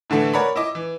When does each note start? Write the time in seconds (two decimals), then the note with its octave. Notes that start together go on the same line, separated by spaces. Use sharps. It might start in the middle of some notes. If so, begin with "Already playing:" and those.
0.10 A2 D3 E3 A3
0.33 A#4 C#5 D5 F#5 A#5 B5
0.55 E4 D#5 D6
0.75 E3